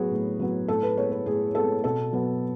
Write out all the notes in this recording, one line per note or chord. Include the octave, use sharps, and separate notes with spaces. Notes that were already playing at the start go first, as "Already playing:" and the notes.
Already playing: A2 F#3 B3 F#4 G#4
A2
F#3 B3
A2 A4
B4
G#3 B3 C#5
B4
A2 G#4
G#3 B3 A4
B2 A4
F#3 B3